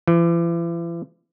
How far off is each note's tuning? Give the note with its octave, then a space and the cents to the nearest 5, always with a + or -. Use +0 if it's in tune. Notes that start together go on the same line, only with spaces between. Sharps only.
E3 +40